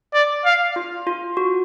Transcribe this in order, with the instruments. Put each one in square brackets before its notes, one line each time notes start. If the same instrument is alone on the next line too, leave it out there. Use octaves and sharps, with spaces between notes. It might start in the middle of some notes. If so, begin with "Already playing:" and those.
[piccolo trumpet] D5
F5
[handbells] F4
F4
F#4